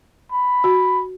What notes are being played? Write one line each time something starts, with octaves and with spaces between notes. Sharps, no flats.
B5
F#4